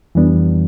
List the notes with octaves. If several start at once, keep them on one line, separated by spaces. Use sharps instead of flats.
F2 E3 G3 B3 D4